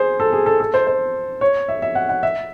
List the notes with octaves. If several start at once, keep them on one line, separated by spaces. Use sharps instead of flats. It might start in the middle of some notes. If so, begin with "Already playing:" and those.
Already playing: G#4 C5
A4
G#4
A4
A4
C5
C5
C#5
E5
E5
F#5
F#5
E5